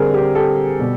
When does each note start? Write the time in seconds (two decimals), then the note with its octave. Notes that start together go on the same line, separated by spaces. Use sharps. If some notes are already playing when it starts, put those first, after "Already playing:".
Already playing: D3 G3 C4 G#4 A#4
0.14 G4
0.35 G4 A4
0.79 B2 G3